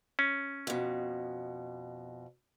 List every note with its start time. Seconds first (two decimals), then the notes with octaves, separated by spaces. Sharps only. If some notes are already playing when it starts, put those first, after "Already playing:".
0.19 C#4
0.67 F2 B2